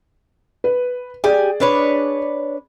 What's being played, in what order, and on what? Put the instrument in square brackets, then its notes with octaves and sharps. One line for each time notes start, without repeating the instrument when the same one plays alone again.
[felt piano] B4
[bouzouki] G4 G#5 [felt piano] G#4 D5
[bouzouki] D4 B4 C#5